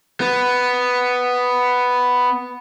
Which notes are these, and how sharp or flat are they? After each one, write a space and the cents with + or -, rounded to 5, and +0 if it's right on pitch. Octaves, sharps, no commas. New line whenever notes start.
B3 +5